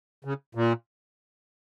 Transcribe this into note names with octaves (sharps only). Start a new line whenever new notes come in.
C#3
A#2